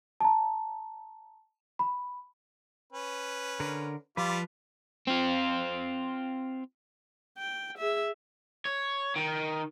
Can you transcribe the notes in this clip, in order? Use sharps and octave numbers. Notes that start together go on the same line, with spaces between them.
A5 A#5
B5
C#4 B4
D3 A#4
F3 G3 F4 B4 D6
C4 F4
G5
G#4 E5
C#5
D#3